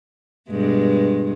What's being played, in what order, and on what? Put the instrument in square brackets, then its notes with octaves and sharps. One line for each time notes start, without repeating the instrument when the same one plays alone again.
[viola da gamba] G2 B2 G#3